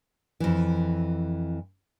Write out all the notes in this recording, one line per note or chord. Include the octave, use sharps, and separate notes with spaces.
F2 E3